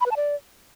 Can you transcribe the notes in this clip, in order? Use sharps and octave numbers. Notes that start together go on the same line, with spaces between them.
B5
B4
A5
D5